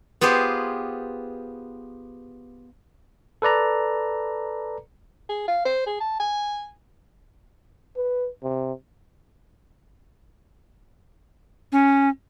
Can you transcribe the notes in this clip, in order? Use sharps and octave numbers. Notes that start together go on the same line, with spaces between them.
B3 F4 G4 G#4 C5
A4 B4 D5 A#5
G#4
F5
C5
G#4
A5
G#5
B4
C3
C#4